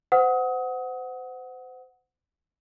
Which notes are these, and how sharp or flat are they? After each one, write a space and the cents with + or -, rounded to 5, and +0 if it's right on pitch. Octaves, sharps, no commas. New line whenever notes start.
C5 -30 F#5 +0 D#6 +30